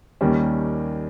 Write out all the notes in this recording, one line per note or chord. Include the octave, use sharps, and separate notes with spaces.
D#2 D#3 G3 A#3 C#4